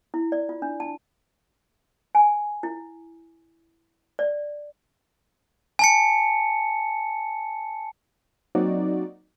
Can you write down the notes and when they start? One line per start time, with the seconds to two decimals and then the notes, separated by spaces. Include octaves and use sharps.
0.14 E4
0.32 D5
0.49 F4
0.62 D4
0.80 A5
2.15 G#5
2.63 E4
4.19 D5
5.79 G#5 A5 C#7
8.55 F#3 A#3 C4 D#4 F#4 D5